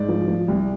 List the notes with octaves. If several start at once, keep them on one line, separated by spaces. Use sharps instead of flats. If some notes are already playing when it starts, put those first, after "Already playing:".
Already playing: G#2 D5
F3
F3
C2